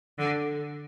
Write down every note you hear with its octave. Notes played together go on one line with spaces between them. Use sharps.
D3